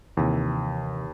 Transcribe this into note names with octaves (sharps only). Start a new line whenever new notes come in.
D#2 C3 E3